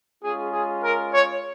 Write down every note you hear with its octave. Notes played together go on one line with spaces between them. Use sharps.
G#3 C#4 F4 G#4
G#4
A#4
C#5